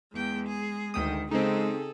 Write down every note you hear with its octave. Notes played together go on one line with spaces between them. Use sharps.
E2 G#3 G5
G#4
D2 D#3 G5 D#6
C#3 G#3 C4 D#4 G#4 A4